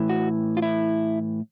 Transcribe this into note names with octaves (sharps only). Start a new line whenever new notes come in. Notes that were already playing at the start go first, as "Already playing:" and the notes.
Already playing: A2 E3
F#4
F4
E4